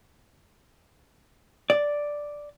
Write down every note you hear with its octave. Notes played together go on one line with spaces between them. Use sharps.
D5